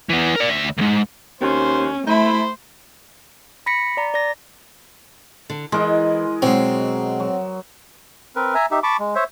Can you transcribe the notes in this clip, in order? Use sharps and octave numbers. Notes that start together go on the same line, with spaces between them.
E3 B3
A#4 D5
D2 E5
C#2 G#2
D#2 C#4 C5
A3 E4 C5 B5
B5 A#6 B6 C#7
D5 A#5
D5 A#6
D3
E3 G#3 A#4 D#5
B2 F#3 G#3 C4
F#3
C4 A#4 B4
E5 G#5 A#5
D#4 G4 E5
A5 B5 C#6 D6
G#3
C5 C#5 E5